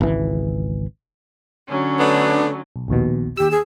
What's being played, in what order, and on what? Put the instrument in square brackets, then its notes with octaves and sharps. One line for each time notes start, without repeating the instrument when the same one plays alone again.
[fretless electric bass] G#1 C#2 E3
[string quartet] D3 F#3 C#4
[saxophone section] A3 B3 D4
[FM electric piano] B1
A#1 D#2 B2
[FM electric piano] D#2 E6 [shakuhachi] G4
[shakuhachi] G#4